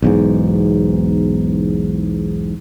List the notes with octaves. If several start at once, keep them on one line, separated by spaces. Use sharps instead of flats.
B1 E2 G#2